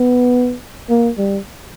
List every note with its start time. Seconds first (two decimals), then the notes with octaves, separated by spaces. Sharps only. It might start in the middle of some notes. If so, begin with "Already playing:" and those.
Already playing: B3
0.90 A#3
1.17 G3